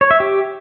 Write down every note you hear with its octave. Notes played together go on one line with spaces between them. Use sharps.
C#5
E5
G4